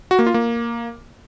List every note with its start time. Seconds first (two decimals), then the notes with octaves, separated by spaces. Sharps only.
0.11 F#4
0.19 A#3
0.27 F4
0.34 A#3